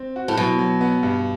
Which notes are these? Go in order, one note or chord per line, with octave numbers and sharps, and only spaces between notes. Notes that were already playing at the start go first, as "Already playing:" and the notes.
Already playing: C4
F#4
A2
B2 F#3
F#3
B3
G2